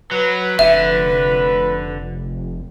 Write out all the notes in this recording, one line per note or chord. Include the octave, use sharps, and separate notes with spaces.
F#3 B4
F1 D3 E5